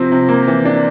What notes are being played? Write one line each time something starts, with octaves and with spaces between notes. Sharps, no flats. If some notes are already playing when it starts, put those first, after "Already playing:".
Already playing: C3 F3 C4
C3
A#3
E3
D4